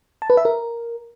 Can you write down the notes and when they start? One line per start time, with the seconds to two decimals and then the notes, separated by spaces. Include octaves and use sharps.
0.22 A5
0.30 B4
0.37 E5
0.45 A#4